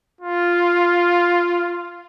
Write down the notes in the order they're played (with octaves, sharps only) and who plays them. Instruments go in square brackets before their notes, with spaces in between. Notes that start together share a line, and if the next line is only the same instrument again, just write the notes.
[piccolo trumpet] F4